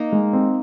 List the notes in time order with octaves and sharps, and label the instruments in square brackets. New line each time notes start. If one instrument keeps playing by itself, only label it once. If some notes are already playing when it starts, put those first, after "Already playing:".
Already playing: [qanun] A#3 D#4
[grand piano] G#3
C4